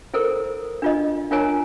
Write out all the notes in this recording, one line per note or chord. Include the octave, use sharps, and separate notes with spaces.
E4 A4 A#4 C5
D4 F4 D#5
D4 F4 A#4 C#5 G#5 A#5